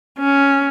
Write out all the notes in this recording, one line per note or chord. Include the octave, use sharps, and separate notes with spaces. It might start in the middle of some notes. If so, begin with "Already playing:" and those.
C#4